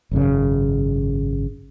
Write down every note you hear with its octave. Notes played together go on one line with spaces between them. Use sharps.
G#1 F#2 A2 C#3